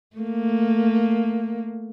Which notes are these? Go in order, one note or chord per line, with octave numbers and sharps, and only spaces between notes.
A3 A#3